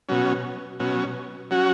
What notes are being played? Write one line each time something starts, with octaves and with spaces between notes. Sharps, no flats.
B2 F#3 C#4
B2 F#3 C#4
F#3 C#4 F#4